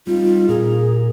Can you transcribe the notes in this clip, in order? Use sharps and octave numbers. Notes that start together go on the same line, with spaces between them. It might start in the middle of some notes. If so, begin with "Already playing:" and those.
G3 C4 D#4 F4
A#2 G#4 A#4